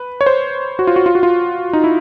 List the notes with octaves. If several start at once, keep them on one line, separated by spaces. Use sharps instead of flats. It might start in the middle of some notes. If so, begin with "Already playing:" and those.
Already playing: B4
C#5
C5
F#4
F4
F#4
F4
F#4
F4
D#4
E4